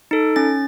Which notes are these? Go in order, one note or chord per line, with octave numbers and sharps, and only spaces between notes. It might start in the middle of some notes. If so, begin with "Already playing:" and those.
D#4 A4
C#4 A6